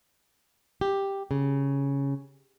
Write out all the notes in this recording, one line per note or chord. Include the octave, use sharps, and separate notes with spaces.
G4
C#3